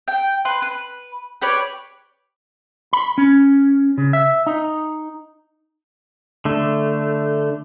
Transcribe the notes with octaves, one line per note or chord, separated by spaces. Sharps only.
G5
B4 C6
B4
G4 B4 C#5 D5
B5
C#4
C#3
E5
D#4
D3 A3